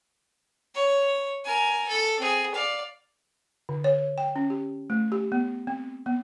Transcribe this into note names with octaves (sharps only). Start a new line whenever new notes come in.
C#5
A#4 G#5
A4
C4 G#4
D5 F5
D3
C#5
G5
C#4
G4
A3
G4
B3
C4
B3